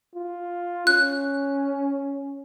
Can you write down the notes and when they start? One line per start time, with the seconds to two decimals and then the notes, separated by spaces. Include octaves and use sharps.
0.15 F4
0.87 C#4 F#6